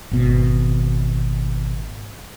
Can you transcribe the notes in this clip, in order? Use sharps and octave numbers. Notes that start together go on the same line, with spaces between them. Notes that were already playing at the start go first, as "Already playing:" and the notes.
G#1 B2